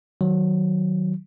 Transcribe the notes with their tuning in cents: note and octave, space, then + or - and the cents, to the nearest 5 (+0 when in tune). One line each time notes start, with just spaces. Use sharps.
D#3 +0 F#3 +0